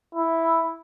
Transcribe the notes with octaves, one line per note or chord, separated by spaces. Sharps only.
E4